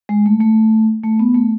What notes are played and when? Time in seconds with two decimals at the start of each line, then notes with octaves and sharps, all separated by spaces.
0.09 G#3
0.26 A3
0.41 A3
1.04 A3
1.19 B3
1.35 A3